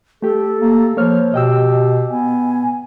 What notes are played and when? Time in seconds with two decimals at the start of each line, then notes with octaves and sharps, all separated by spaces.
0.22 A3 G4 A4
0.59 A#3
0.97 F3 A#3 C5 C#5 F6
1.34 B2 G4 D#5 G5 E6
2.10 B3 G#5